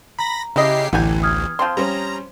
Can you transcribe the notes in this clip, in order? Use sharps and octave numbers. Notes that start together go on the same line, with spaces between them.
A#5 B5 A#6
C#3 E4 G4 D#5 C7
A1 D2 E3 B3 G4 G#5
D#6 F6 G#6
F3 C4 C6
G3 C#4 C5 A#5